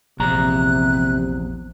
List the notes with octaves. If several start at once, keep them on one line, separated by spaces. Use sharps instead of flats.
A#1 E2 C3 A#5 F#6